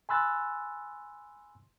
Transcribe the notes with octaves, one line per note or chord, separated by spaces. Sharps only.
G#5 B5 C6 E6 F#6 A6